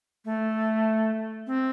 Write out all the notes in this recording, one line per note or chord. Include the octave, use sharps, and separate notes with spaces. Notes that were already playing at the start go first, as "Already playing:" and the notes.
A3
C4